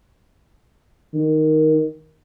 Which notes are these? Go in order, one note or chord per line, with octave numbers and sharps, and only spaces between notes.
D#3